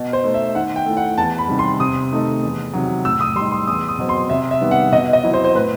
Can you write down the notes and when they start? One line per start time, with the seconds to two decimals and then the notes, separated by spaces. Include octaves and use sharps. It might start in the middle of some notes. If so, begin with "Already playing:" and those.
Already playing: B2
0.13 C5
0.24 A3 D#4
0.34 E5
0.55 D#3 F#5
0.76 G5
0.86 A3 E4
0.97 F#5
1.17 E2 A5
1.38 B5
1.48 C3 D#3 G3
1.59 C6
1.80 C3 D#6
2.12 D#3 A3 D#4
2.42 E2
2.73 C3 D#3 F#3
3.05 A2 E6
3.21 D#6
3.36 G3 C6
3.40 D#4
3.52 C6
3.67 E2 D#6
3.88 D#6
3.98 B2 F#3 C4
4.09 C6
4.29 C3 E5
4.51 E5
4.61 D#3 G3 B3
4.71 F#5
4.92 B2 D#5
5.13 D#5
5.23 F#3 C4 E4
5.34 C5
5.44 C5
5.55 A2 B4